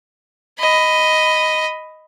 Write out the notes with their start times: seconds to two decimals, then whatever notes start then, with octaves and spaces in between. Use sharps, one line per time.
0.59 D#5 B5